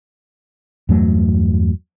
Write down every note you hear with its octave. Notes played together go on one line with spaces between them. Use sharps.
E2 G2 F#3 A3